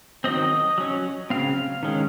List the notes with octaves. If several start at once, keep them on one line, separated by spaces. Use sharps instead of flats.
D#3 F#3 C4 D#5
F#3 C#4
C#3 F#3 C4 F5
D#3 G#3 C#4